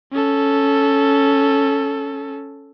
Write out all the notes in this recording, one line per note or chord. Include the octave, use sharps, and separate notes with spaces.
C#4 A4